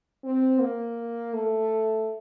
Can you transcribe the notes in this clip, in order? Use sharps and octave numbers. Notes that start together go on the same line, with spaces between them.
C4
A#3
A3